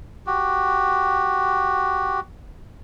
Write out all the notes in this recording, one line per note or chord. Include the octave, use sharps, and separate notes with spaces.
F#4 G4